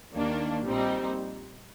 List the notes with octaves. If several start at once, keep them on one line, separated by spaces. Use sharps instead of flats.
D#2 D#3 A#3 D4
A#1 A#2 G3 C4 D#4